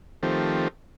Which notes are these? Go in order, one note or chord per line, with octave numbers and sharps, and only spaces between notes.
D#3 F3 A3 C4 G4